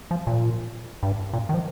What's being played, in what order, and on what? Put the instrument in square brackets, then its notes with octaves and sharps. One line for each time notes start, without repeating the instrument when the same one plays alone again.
[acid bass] F3
A#2
G2
A#2
D#3
F3